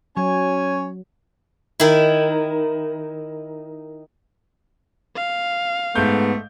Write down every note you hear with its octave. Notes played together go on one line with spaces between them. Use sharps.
F#3 C#4 C#5 G#5
D#3 E4
F5
G#2 A3 B3 G6